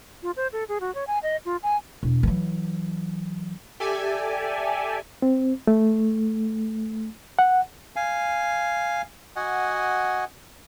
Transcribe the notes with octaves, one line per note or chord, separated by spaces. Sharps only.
F4
C5
A4
G#4
F#4
C#5
G#5
D#5
F4
G#5
E1
E3 F#3
G4 A4 D5 E5 G#5
C4
A3
F#5
F5 G#5
F#4 D#5 F#5 G#5